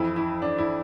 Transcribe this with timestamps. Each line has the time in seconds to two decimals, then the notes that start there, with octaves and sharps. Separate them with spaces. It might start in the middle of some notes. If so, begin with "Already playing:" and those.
Already playing: F2 E3 E4
0.16 E4
0.42 D4
0.58 E4